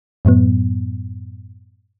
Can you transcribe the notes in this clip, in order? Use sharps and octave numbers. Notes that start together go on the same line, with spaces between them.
F#2 A2 F#3 B3